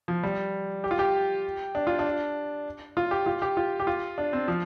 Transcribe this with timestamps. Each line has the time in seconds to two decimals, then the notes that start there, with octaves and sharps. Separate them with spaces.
0.08 F3
0.23 G3
0.84 G4
0.91 F4
0.99 G4
1.75 D4
1.87 F4
1.99 D4
2.97 F4
3.11 G4
3.26 F4
3.42 G4
3.57 F4
3.80 G4
3.87 F4
4.18 D4
4.33 C4
4.48 F3